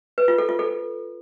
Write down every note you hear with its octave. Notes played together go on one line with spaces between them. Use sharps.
B4
F4
A4
F4
A4